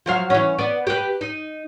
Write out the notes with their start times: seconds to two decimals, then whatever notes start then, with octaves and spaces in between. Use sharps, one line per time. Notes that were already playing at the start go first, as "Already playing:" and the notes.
0.06 F3 F#3 F5
0.30 E3 C#4
0.58 B3 B4 D5
0.87 G4 B4
1.21 D#4